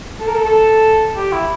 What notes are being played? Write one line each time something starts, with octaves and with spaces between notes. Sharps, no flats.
A4
A#4
A4
A4
G4
E4